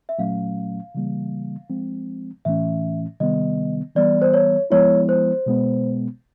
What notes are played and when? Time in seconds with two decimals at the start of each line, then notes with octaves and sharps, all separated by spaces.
0.09 E5
0.19 A#2 F#3 A3 C#4 F5
0.95 C#3 E3 G3 A#3
1.70 F3 G#3 C4
2.45 A2 E3 A3 C#4 E5
3.20 C3 D#3 G3 B3 D#5
3.95 E3 G3 B3 D5
4.22 C5
4.34 C#5
4.70 F3 G#3 B3 E4 C#5
5.09 C5
5.46 B2 G#3 B3